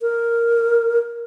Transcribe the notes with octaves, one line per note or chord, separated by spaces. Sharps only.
A#4